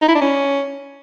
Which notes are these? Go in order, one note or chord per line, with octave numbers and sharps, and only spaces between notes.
D#4
E4
D4
C#4